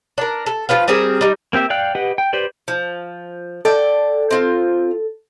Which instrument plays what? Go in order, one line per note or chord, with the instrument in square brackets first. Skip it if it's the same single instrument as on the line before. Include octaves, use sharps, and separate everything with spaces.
[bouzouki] D4 A#4
A4
F3 F4 B4 F5
G3 C4 G#4 A#4
G3 D#4
[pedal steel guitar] A#3 C4 G4 E5
D5 F5 G5 F#6
G4 B4 D#5 F#5
G5
G4 B4 C5 D5
[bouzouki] F3
[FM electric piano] A4 [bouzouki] D5 G5
[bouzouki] C4 F4